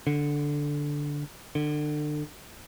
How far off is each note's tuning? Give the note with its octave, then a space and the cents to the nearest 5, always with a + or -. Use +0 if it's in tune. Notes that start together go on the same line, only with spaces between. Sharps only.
D3 -5
D3 +30